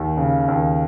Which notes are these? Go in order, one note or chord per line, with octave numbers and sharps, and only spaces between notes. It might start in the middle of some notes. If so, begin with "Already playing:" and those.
Already playing: D#2
C#3
D#2